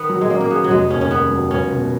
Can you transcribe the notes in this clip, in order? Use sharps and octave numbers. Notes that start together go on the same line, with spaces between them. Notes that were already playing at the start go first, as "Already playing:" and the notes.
Already playing: D#3 B3
F#3
G#3
A#3 C#4
A#3
B3 G#4
F#3
F1 G#3
D#2 C#4
C#4
D#3 B3
F#3
C#2 C#4
B2